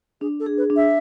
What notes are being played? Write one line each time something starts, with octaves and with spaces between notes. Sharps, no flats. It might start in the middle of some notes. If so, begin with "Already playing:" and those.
D4 G#4
A4
G#4
B4
D4
E5